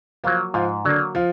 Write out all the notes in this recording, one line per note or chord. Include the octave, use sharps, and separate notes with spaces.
F3 F#3 A#3 F4
G#2 F3 F4
D3 F#3 A#3 D4
F3 F4